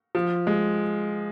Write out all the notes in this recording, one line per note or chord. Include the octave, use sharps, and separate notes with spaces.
F3
G#3